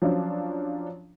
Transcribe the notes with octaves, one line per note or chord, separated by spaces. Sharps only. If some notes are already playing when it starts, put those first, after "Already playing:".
F3 F#3 C#4 D4 F4